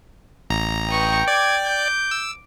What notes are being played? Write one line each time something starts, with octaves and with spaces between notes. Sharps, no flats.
A1 A#5
B4 D#5 G5 C#6
D5 D6 G#6
G6
E6